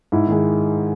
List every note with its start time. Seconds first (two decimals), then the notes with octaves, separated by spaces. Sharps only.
0.12 G#2 E4
0.28 D#3 G#3